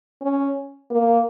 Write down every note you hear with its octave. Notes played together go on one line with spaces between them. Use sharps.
C#4
A#3